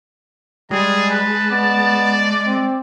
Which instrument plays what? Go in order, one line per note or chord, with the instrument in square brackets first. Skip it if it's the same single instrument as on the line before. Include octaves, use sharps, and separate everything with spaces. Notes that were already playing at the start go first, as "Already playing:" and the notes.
[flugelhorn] G3 [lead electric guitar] G#3 [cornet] G#4 [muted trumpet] A5
[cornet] B4
[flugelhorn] B3 [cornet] D5
[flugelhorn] C4